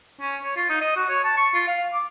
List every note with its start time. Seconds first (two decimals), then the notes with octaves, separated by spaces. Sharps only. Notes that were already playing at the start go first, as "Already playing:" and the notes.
0.20 C#4
0.43 C#5
0.56 F4
0.70 D#4
0.81 D#5
0.96 F#4
1.09 C#5
1.24 A5
1.37 C#6
1.54 F4
1.67 F5
1.93 D6